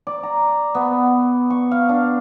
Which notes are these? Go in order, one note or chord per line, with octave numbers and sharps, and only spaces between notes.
D5
A#5
B3
C#6
F5
D4